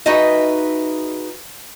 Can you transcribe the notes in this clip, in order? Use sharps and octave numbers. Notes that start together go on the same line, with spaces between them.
D#4 F#4 G#4 B4 D#5 E5